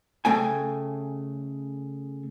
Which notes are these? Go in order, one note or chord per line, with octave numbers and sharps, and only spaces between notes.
C#3 A3 G5 G#5